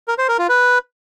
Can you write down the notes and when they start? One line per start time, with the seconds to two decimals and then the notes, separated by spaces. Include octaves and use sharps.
0.08 A#4
0.18 C5
0.28 A#4
0.39 F4
0.49 B4